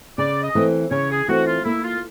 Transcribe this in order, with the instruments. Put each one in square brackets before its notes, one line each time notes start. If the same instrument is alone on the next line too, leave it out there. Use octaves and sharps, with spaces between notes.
[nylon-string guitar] C#3 [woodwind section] D5
[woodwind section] D#5
[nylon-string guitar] E3 A3 C4
[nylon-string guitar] C#3 [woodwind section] C#5
[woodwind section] G#4
[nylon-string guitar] E3 A3 C4 [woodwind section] F#4
[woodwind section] F4
[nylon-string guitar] A#3 [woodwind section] E4
[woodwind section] F4